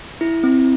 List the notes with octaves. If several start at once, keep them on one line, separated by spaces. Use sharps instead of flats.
E4
C4